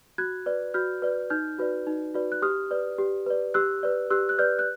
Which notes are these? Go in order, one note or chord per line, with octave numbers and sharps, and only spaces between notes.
F#4 F#6 G#6
B4 D5
F#4 F6 G6
B4 D5
D#4 F6 G6
F#4 B4 D5
D#4
F#4 B4 D5
F#6
G4 D#6 F6
B4 D5
G4
B4 D5
G4 E6 F#6
B4 D5
G4 E6 F#6
F#6
B4 D5 F6 G6
F#6